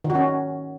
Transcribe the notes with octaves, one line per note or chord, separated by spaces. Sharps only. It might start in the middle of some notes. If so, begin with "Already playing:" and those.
D#3
F#4
C#4